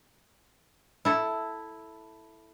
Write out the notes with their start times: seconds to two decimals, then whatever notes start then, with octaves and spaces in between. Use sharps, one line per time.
1.05 E4 A4